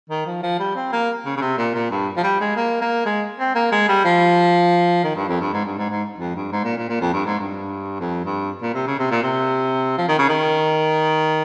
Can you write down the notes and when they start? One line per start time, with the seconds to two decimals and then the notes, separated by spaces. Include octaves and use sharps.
0.10 D#3
0.26 F3
0.42 F3
0.59 G3
0.75 C4
0.92 A#3
1.25 C#3
1.37 C#3
1.41 C3
1.57 A#2
1.74 A#2
1.91 G2
2.17 F3
2.23 G3
2.40 G#3
2.56 A#3
2.81 A#3
3.06 G#3
3.39 C4
3.55 A#3
3.72 G#3
3.88 G3
4.05 F3
5.04 D#3
5.16 G2
5.29 F2
5.41 G2
5.53 G#2
5.65 G2
5.78 G#2
5.90 G#2
6.18 F2
6.35 G2
6.52 G#2
6.64 A#2
6.77 A#2
6.89 A#2
7.01 F2
7.13 G2
7.26 G#2
7.39 G2
8.00 F2
8.25 G2
8.62 A#2
8.74 C3
8.87 C#3
8.99 C3
9.11 A#2
9.23 C3
9.98 F3
10.08 D#3
10.19 C#3
10.29 D#3